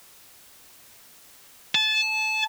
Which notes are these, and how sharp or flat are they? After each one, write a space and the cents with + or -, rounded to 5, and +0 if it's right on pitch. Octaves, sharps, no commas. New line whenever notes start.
A5 -25